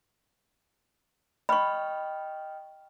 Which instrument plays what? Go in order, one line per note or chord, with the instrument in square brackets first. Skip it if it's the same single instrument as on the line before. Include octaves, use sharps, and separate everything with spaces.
[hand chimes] D#5 G5 F6 [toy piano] B5 C#6